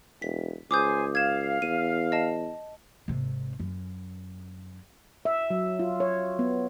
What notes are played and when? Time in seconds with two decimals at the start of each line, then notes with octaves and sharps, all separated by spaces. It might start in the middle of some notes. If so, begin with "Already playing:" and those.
0.22 E1 B6
0.71 C#2 G#4 C5 G#5 D6 D#6 G6
1.15 F5 G#6 E7
1.62 E2 D#7
2.12 D#5 A5
3.08 G#1 C3
3.60 F#2
5.25 E5
5.50 F#3
5.79 F4
6.00 C#5
6.39 B3